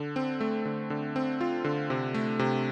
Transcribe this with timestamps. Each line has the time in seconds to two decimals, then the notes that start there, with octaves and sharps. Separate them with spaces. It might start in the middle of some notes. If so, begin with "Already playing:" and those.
Already playing: D3
0.16 C4
0.40 A3
0.65 D3
0.90 D3
1.16 C4
1.41 F4
1.64 D3
1.90 C3
2.14 A3
2.39 C3